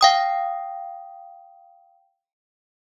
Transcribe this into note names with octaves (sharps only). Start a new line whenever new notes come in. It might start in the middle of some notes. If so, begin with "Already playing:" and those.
F5 G5 D#6